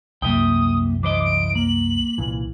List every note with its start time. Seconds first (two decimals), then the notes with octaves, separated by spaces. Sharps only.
0.22 C2 F#2 A#3 E5 G5 D#6
1.03 E3 C5 D#5 D6
1.25 D7
1.55 A#3 F#7
2.18 C2 A#2 E3